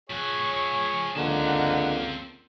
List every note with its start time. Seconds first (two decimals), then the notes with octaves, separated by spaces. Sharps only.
0.10 F3 G#4 C#5 F#5
1.16 C#2 D3 A#3 C4 D#4 F#5 A5